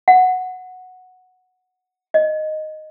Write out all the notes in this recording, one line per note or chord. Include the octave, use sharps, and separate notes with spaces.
F#5
D#5